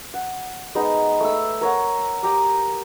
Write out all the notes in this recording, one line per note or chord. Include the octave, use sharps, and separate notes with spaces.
F#5
G#3 B3 D#4 C5
A3 E6
A#4 C#5 F#5
G4 A#5 D6 D#6